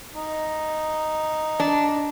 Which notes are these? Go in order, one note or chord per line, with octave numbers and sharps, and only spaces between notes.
D#4
D4